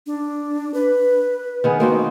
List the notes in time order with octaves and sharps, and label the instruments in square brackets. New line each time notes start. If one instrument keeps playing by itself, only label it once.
[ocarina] D4
B4
[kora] D#3 B3 G#4
[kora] A#3 C4 D#4 [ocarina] F#4